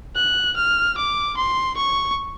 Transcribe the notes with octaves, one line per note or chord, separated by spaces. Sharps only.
F#6
F6
D6
C6
C#6